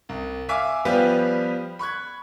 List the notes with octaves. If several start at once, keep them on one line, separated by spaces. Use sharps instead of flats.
C2
E5 F5 G#5 D6
F3 G3 B3 G4 B4 F5
B5 C#6 F#6 G#6